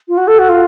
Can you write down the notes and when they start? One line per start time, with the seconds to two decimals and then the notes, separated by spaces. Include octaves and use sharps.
0.08 F4
0.18 F#4
0.28 A4
0.39 F#4
0.49 F4